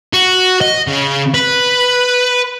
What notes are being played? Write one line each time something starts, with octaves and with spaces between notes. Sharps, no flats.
F#4
D#5
C#3
B4